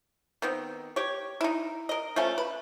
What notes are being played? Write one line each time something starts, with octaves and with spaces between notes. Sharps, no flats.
D#3 B3 C4
G4 C#5
D#4 E4
A#4 D#5
F3 A3 C#4
B4